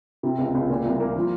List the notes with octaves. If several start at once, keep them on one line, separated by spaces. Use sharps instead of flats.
C3
C#2
C#2
A#2
C2
A#3
F3